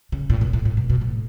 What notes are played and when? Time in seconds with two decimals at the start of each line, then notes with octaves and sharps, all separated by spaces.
0.12 C#3
0.30 A2
0.41 B2
0.53 A2
0.65 A2
0.77 B2
0.90 B2
1.01 A2